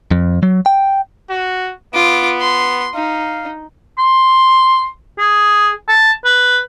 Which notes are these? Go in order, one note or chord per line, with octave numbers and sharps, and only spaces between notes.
F2
F#3
G5
F#4
B3 F4 D6
C6
D#4 F5
C6
G#4
A5
B4